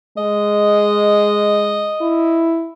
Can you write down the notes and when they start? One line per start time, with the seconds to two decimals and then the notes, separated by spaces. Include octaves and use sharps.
0.18 G#3 D#5
2.02 E4